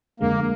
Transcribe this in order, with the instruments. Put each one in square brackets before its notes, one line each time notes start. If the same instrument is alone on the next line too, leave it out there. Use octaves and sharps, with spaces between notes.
[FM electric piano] F2 D3 G#3 [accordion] A#3